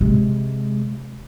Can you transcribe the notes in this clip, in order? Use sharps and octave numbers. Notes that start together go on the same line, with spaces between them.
C3 G#3